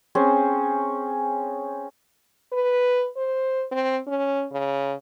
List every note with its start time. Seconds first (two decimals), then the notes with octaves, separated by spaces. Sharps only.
0.15 C4 C#4 G#4 C5
2.52 B4
3.17 C5
3.71 C4
4.07 C#4
4.52 C#3